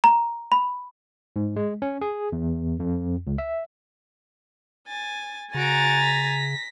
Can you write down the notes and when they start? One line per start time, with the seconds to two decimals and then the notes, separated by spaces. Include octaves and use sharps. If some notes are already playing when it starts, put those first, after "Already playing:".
0.04 A#5
0.52 B5
1.36 G#2
1.56 G#3
1.82 C#4
2.01 G#4
2.32 E2
2.80 F2
3.27 C#2
3.38 E5
4.88 G#5 A6
5.54 C#3 F#4 G#5 A#5 A6 D7
6.02 A#6 B6